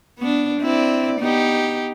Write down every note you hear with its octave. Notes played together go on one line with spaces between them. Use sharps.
B3 D4
C4 E4 D5
B3 D#4 G4